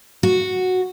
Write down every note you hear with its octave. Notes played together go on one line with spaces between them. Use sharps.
F#4